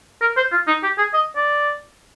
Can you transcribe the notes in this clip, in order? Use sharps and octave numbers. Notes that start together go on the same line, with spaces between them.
A#4
C5
F4
D#4
G4
G#4
D#5
D5